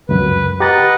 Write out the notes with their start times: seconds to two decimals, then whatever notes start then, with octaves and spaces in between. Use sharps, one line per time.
0.09 C#2 F#2 B4
0.60 G4 B4 D#5 F#5 A#5 A6